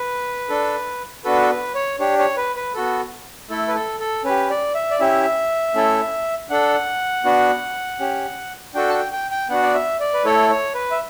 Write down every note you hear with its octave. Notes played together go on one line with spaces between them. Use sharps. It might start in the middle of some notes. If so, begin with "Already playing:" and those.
Already playing: B4
D4 A4
B3 D4 F#4 A4 B4
A4
B4
C#5
D4 G4 C#5
C#5
B4
B4
B3 F#4 A4
A3 E4 A4
B4
A4
A4
C#4 G4 B4
D5
E5
D5
C#4 E4 G4 E5
A3 C#4 E4 A4
D4 A4 F#5
B3 D4 F#4
C#4 G4
D4 F#4 A4 G5
A5
G5
G5
G5
B3 D4 F#4 F#5
D5
E5
D5
B4
A3 E4 A4 C#5
C#5
B4
E5